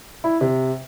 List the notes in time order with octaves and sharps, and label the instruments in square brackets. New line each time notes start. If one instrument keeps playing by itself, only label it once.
[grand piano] E4
C3